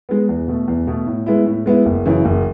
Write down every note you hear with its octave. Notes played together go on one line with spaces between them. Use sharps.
G#3 B3
E2
B2 A3
E2
B2 A3
A2
G#3 B3 E4
A2
G#3 B3 E4
F#1
F#2 C#3 E3
F#1